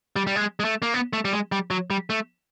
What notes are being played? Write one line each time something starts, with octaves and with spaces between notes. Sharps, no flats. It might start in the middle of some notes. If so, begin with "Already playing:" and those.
G3
G3
G#3
G#3
A3
A#3
B3
A3
G3
G#3
G3
F#3
G3
A3